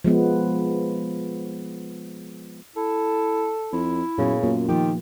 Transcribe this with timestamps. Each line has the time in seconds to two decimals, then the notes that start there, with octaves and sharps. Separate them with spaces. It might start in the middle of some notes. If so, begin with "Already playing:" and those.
0.04 F3 G#3 B3
2.76 E4 A4
3.73 F2 E4
4.18 F#2 A#2 C#3 B3 A#4
4.43 F#2 A#3 F4
4.68 D#3 F3 A#3 F4 G4